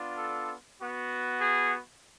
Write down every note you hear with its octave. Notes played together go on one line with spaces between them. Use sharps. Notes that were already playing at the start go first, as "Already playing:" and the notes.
Already playing: B3 D4 F4
A4
B3 F#4
G#4